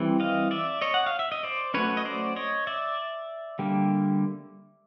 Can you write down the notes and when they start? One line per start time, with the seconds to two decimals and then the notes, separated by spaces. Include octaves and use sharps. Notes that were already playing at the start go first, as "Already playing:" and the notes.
Already playing: E3 G3 C4
0.20 D#5 F5
0.51 D5 E5
0.81 C#5 D#5
0.94 F#5
1.06 F5
1.19 E5
1.32 D#5
1.43 C5 D5
1.74 F#3 A3 C#4 B4 C#5
1.97 D#5
2.05 C5 D5
2.36 C#5 D#5
2.67 D5 E5
3.59 D3 G3 A#3